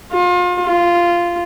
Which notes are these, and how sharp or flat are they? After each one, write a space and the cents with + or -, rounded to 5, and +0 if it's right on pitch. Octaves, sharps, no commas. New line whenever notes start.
F4 +35
F4 -10